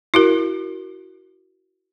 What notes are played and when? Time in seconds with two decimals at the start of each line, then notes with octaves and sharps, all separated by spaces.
0.14 E4 F#4 A#4